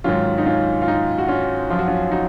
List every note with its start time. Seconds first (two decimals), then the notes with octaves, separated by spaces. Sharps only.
0.04 G#2 D#3 F#3 C#4 F4
0.38 D#4
0.46 C#4 F4
0.82 F4
0.88 D#4
1.18 F#4
1.28 C#4 F4
1.70 F#2 F3 F4
1.79 F#4
1.87 C#4 F4
2.11 D#4 F#4